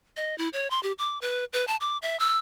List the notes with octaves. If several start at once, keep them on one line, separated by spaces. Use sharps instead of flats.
D#5
E4
C#5
C6
G4
D6
B4
B4
A5
D6
E5
E6